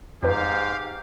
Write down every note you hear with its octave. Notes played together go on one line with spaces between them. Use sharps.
F2 G#2 G4 B4 F5